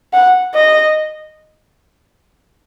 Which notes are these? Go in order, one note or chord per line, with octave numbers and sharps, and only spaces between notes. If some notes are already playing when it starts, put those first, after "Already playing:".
F#5
D#5